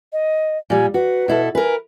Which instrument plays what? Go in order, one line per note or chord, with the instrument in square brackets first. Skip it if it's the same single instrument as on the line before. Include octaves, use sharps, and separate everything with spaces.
[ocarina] D#5
[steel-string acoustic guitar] A#2 G3 [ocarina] G#5
[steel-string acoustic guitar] F#4 [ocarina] B4
[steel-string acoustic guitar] B2 E4 A4
[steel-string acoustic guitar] A#4 B4 [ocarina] G#5